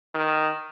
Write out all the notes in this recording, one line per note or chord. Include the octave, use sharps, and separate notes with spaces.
D#3